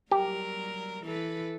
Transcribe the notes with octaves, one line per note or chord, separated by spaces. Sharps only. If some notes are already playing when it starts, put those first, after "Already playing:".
F#3 G3 G4 A#4
E3 A4 B4